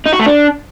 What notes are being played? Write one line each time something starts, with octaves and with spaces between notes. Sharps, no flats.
D#4
F#4
A3
D4